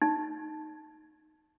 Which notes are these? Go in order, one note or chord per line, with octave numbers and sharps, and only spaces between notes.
D#4